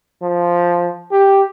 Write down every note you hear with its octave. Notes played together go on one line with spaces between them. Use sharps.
F3
G4